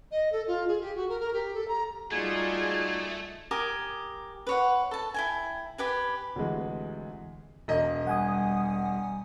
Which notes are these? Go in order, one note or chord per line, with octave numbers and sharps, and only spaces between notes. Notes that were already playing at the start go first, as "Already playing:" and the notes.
D#5
A4
F4
G#4
G4
F#4
A#4
A#4
G4
A4
A#5
G3 A3 D#4 F4 F#4 G#4 D5 G#6
G4 A#4 G#5 D#6
B4 C#5 F#5
A4 A5
E4 G5 G#5
G4 B4 G#5
D2 C3 E3 G#3
E1 D#5
G3 F#5 G#5 D#6